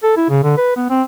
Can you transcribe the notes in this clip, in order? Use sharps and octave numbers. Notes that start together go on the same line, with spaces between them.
A4
E4
C#3
D3
B4
B3
C4